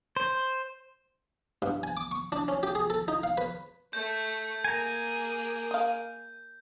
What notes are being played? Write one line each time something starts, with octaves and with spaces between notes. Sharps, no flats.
C5
G2
G#5
D6
C#6
D4
C#4
G4
G#4
A4
D#4
F5
B4
A3 G6
A#3 G#4 G#5 A#5
D#5 F5